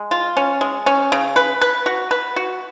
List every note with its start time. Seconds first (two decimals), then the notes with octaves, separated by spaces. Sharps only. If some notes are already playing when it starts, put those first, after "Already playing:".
Already playing: G#3
0.11 F4
0.37 C#4
0.61 G#3
0.86 C#4
1.12 C#3
1.36 B4
1.61 B4
1.86 F#4
2.11 B4
2.36 F#4